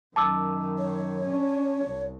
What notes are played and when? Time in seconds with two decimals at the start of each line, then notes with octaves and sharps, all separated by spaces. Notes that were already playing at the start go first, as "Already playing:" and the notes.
0.16 F#2 D#3 A5 D6 E6
0.79 C#5
1.25 C#4 D4
1.86 C2